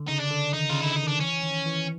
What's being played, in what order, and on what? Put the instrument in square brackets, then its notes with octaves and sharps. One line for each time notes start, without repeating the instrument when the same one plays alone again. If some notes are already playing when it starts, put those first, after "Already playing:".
Already playing: [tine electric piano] D3
[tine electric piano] C#3 [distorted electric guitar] D#4
[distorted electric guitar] D4
[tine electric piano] D3
[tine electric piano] D#3 [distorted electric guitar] D#4
[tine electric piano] C#3 [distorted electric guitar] F4
[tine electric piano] D3 [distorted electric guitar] E4
[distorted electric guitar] D#4
[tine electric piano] D#3 [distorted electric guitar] D4
[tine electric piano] E3 [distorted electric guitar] C#4
[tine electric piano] D#3
E3